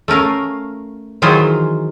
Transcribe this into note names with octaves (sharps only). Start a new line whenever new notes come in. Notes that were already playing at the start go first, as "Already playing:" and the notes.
A3 C#4 A#4 F5
D#3 E3 F#3 F4 G#4 C5